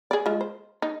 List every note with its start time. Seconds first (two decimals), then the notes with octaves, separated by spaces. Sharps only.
0.11 G#4 D5
0.26 G#3 F4
0.41 C5
0.82 D#4